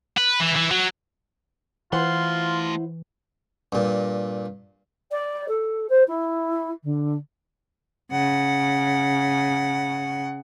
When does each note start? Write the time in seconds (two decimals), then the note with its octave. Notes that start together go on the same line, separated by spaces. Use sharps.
0.18 B4
0.40 E3
0.56 E3
0.71 F#3
1.93 E3 A3 E4 F4 C5 F#5 C6
3.72 G2 A#2
5.11 D5
5.48 A4
5.89 C5
6.07 E4
6.83 D3
8.12 C#3 F#5